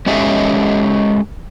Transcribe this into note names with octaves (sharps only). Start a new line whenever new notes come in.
G#3 C#4 G4 A4 D#5 E5